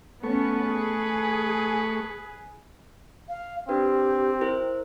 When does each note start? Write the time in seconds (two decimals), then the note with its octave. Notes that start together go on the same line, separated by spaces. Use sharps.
0.23 A3 B3 C#4 A4 B4 C#6
0.68 G#4
3.29 F5
3.69 C4 D4 G4 B4
4.41 E4 A#4 C5